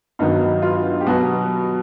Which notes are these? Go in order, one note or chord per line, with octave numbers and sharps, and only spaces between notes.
G2 D#3 F#3 B3 D#4
F4
G4
B2 F#3 B3 F#4